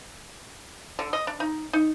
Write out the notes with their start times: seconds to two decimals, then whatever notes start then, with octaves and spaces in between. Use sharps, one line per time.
0.99 D3
1.13 D#5
1.27 D4
1.40 D#4
1.73 D#4